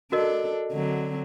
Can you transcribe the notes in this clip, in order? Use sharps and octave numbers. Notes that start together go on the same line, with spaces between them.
D4 F#4 A4 A#4 D#5
D3 F#3 C4